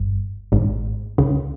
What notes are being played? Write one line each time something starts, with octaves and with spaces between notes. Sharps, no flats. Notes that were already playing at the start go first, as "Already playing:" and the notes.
Already playing: G1 G2
G#1 G#2
C#2 C#3